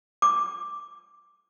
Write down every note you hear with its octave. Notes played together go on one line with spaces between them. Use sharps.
D6